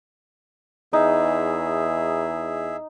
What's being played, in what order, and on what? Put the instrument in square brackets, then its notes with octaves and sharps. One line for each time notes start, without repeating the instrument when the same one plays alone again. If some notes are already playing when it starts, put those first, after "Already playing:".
[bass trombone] E2 [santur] D#4 [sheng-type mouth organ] G#4 E5